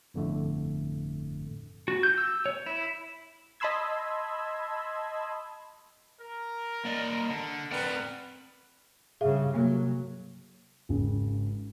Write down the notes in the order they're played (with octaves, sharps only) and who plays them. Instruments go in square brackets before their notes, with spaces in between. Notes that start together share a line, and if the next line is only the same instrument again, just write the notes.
[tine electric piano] G1 F2 A2 D3 A3
[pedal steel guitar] F#4
G6
E6
C#5
E4
[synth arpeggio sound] D#5 A5 B5 C6 E6 G#6
[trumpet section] A#4
[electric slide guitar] A#3 D5 D#5
D3
[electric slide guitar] C4 D5 F#5 [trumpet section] A#4 B4
[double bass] G2 C#3 [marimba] G#4 E5 F5
[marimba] C3 A#3 [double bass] F#3
[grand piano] G#1 C#3